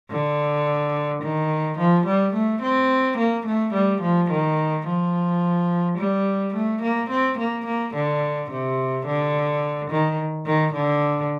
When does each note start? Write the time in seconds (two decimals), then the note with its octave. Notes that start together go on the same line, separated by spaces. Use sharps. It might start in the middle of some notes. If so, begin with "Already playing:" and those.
0.10 D3
1.22 D#3
1.79 F3
2.06 G3
2.34 A3
2.62 C4
3.18 A#3
3.47 A3
3.74 G3
4.02 F3
4.31 D#3
4.87 F3
5.98 G3
6.55 A3
6.82 A#3
7.10 C4
7.38 A#3
7.66 A#3
7.94 D3
8.51 C3
9.06 D3
9.91 D#3
10.46 D#3
10.74 D3